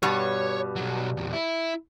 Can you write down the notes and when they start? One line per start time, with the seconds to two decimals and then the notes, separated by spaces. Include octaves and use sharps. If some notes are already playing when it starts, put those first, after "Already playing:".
0.03 G2 B2 G3 C#5
0.76 B1 F#3
1.17 E2 A#2
1.32 E4